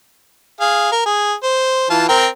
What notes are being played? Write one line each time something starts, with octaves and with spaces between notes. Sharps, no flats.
G#4 F5
A#4
G#4
C5
E3 F4 A5
C4 A#4 G5